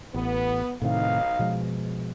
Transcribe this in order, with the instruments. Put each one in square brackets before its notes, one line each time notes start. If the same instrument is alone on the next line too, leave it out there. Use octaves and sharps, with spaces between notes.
[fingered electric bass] A1 [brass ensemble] B3
[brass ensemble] B1 D#4 F5 [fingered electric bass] A2 C3 D#3
[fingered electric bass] B2 F3 G#3